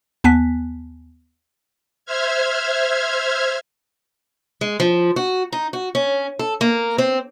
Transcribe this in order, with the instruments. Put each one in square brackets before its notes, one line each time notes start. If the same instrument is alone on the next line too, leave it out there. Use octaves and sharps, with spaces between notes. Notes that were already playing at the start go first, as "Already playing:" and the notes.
[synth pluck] D#2 B3 G#5 A5 F#6 B6
[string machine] C5 E5 F6 G#6
[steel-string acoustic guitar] G#3
F3
F#4
D#4
F#4
C#4
A4
A#3
C4